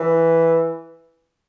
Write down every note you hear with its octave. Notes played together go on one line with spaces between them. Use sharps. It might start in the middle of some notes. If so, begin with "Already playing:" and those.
Already playing: E3